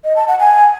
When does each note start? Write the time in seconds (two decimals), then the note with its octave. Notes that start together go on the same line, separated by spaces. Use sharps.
0.04 D#5
0.16 A5
0.28 F#5
0.40 G#5